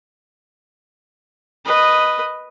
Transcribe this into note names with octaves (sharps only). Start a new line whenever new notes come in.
B4 D#5